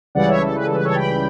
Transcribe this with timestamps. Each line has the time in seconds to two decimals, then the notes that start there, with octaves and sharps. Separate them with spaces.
0.15 C#2 C#3 E3 G3 D5 F#5
0.28 C#5 E5
0.41 A4
0.56 B4
0.65 A4
0.75 B4
0.85 A4 C#5
0.90 A5
0.95 G5 B5